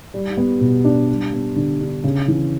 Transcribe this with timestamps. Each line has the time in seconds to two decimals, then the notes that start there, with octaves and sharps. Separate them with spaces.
0.14 G3
0.37 B3
0.61 B2
0.85 D4
1.08 G3
1.33 B3
1.56 D3
1.81 D4
2.04 C#3
2.28 E3